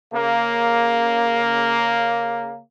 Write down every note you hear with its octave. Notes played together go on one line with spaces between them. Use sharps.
C#3 A#3